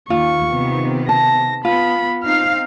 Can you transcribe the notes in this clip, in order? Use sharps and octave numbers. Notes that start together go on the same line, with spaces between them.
D#2 F4 C#6
C3 D#3 B3
A5 A#6
B3 F4 B5
C4 D#4 F5 F6